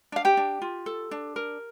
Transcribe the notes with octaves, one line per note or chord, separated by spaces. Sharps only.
D4 F5
G4 G5
D4
F4
A4
D4
A#4